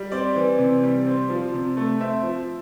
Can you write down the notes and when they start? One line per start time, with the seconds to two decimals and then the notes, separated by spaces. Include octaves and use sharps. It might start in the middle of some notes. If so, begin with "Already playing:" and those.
Already playing: G3
0.12 C4 D5
0.36 E3
0.59 C3
0.83 G3
1.06 C4
1.30 F3
1.53 C3
1.77 A3
2.00 C4 E5
2.23 F3